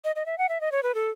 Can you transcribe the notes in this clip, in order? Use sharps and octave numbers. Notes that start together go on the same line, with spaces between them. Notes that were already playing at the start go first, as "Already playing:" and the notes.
D#5
D#5
E5
F#5
E5
D#5
C#5
B4
A4